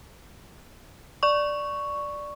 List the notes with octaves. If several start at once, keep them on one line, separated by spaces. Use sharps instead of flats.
D5 C#6